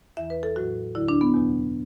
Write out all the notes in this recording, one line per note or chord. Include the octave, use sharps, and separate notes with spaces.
E2 E3 E5
B4
A4
A2 F#3 F#4
D2 D3 F#3 E4
D4
B3
E2 B2 F#3